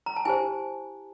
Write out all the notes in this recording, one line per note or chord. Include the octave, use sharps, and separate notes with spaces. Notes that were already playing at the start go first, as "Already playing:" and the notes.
A#5
A5
E4 G4 C5 G#5